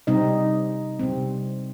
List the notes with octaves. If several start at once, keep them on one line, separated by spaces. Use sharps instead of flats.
C3 G3 C4 D#4 D#5
C3 G3 C4